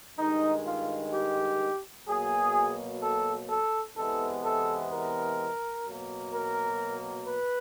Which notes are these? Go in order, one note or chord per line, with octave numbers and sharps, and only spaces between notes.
G2 D#3 G#3 D#4
F4
G4
B2 F#3 A#3 G#4
A4
A4
E2 C3 E3 G#3 B3 A4
A4
A#4
B2 F#3 A#3
A#4
B4